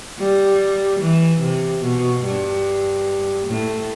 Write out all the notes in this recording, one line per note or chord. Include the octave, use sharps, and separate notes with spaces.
G3
E3
C3
B2
G2
A2